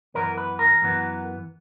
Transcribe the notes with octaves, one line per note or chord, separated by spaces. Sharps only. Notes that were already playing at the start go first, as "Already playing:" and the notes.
F#2 E3 B3 A#4
B4
A#4
F#2 E3 B3